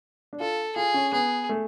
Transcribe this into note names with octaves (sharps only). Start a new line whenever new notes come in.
D4
F4 A4
F4 G#4
C#4
B3 G#4
A3